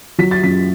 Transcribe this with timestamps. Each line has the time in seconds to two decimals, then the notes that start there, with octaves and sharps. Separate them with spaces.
0.18 F#3 B6
0.31 A6
0.43 F#2 B6